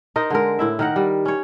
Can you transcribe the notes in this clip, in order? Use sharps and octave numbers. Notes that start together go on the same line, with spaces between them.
D#4 A#4 C5 D#5
D3 G#3 A#4
A2 E4 E5
D#3 A#4 F#5
G3
C#4 C#5